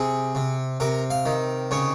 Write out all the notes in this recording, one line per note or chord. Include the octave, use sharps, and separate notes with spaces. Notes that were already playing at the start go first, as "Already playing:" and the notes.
Already playing: C3 G#4
C3
C3 A#4
F5
D#3
C#3 C#5